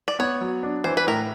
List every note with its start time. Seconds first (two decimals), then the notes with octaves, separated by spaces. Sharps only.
0.08 D5
0.19 B3 C#5
0.41 F#3
0.63 D4
0.84 E3 C5
0.97 B4
1.07 A2 A#4